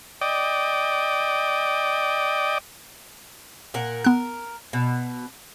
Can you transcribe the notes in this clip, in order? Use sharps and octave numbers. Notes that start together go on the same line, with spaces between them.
D5 D#5 G5
A#2 A#4 F#5
B3 A#4 F#6
B2